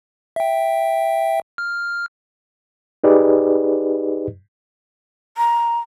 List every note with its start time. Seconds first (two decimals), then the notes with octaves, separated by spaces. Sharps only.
0.36 E5 G5
1.58 F6
3.04 D#4 G4 G#4 B4 D5 D#5
5.37 A#5